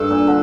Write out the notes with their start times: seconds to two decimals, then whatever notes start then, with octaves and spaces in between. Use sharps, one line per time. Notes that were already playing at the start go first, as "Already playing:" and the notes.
Already playing: G2 A4
0.10 A#2
0.27 D3